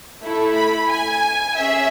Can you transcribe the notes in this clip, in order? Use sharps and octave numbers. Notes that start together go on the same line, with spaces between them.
A3 E4 A4
B5
G#5
C#4 G#4 E5